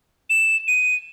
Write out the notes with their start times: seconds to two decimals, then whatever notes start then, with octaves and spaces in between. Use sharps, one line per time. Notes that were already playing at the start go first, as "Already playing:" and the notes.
0.30 E7
0.68 D#7